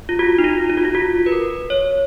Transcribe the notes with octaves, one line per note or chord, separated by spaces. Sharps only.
F4
F#4
D#4
F4
F4
F#4
F4
F#4
B4
A#4
C#5